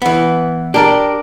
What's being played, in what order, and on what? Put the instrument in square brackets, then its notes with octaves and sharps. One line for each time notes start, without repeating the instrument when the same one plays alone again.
[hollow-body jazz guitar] E3 B3
[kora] D4 A#4 D5 [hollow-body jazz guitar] G4